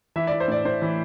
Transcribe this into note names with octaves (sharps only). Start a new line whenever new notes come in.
E3 E5
E3 D5
C5
A2 D5
A2 C5
E3